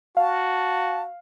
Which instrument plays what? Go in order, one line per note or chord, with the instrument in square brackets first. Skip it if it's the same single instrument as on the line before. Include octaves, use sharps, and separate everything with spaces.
[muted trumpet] F#4 [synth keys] F5 [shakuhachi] A5